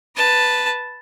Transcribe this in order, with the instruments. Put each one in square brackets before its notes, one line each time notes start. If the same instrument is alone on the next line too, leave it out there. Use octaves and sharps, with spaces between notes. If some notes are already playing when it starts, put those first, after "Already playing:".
[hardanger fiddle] B4 A5